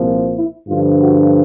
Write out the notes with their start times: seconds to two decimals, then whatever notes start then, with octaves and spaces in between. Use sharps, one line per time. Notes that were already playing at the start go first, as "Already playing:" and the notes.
Already playing: C2 A#2 F3
0.36 E4
0.68 G2 D3 F3 F4
1.00 F#4